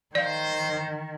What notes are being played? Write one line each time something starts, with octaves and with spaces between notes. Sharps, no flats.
D#3 C5 D5 F5